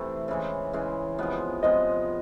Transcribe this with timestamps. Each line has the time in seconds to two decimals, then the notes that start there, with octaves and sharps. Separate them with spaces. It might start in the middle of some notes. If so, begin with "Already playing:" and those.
Already playing: C3 E3 A3
0.28 C#3 E3 G#3
0.73 C#3 E3 G#3
1.18 C3 F3 G#3 B3
1.63 C3 F3 G#3 B3 D#5